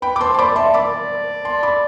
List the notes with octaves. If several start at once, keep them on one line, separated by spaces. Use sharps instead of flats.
B4 G5 B5
D6
C5 A5 C6
C6
D5 B5 D6
E5 A5 C6
D5 B5 D6
A5 C6
B5 D6